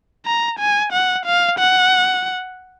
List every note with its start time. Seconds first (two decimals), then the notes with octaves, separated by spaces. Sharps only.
0.25 A#5
0.59 G#5
0.93 F#5
1.26 F5
1.59 F#5